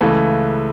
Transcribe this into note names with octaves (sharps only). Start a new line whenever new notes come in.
C#2 C#3 E3 A3